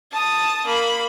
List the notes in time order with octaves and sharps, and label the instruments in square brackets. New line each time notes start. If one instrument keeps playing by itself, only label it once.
[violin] A5 D#6
A#3 B5